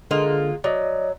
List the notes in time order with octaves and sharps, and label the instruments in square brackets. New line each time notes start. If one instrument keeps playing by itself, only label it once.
[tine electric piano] D3 [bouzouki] G#3 A#3 F4
[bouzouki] F#3 [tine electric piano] D5 D#5